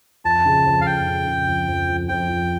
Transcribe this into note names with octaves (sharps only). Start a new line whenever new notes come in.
F2 A5
C#3
F2
F5
F2 G5
C#3
C#3
F2
F2
F2
F2 G5
F2